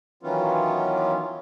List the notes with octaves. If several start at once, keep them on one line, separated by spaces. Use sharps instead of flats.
D#3 E3 F#3 B3 C#4 F4